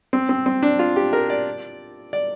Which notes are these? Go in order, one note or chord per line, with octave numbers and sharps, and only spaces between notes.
C4
C4
C4
D4
F4
G4
A#4
D5
D5